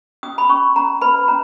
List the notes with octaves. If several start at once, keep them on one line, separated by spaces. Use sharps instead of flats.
C#4 D#6
B5
C#4 C#6
C#4 A#5
B4 B5
C#4 A#5